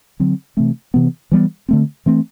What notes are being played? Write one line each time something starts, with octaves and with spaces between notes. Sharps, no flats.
D3 F#3 C4
C3 E3 A3 C4
C3 E3 B3
E3 G3 B3
D3 A3 C4
E3 A3 C4